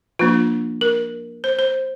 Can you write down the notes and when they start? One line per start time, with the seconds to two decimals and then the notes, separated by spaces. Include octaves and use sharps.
0.19 F3 A#3 D4 F4
0.81 A#4
1.44 C5
1.59 C5